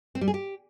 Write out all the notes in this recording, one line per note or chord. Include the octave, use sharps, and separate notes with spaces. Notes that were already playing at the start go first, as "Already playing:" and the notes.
C4
G3
G#4
G4